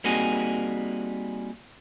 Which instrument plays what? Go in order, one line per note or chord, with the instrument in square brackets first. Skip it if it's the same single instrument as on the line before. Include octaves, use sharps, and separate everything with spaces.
[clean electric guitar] G3 A#3 C4 D#4 F#4 G#4